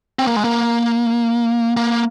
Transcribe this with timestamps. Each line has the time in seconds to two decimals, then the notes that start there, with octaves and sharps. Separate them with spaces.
0.19 C4
0.27 A#3
0.36 G#3
0.44 A#3
1.77 A#3